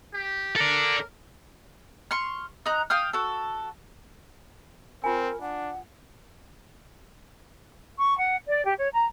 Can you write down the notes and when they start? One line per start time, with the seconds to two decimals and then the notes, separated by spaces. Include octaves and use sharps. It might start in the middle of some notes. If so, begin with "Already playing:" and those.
0.13 G4
0.56 A4 A#4 D5
2.11 C6 C#6 F6
2.66 D#4 A#5 F#6
2.90 F5 G5 D#6 F6
3.13 F#4 A4
5.04 C4 F4 A#4 G#5
5.41 D4 F#5
8.00 C#6
8.18 F#5
8.47 D5
8.65 G4
8.78 C#5
8.94 A#5